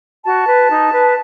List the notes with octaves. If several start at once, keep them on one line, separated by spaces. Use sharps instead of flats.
F#4 A5
B4
D#4
B4